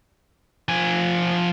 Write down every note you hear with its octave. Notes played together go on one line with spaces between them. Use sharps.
F3 G#5